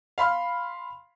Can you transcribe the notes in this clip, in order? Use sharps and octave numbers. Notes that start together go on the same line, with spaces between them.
F5 B5 C6 F6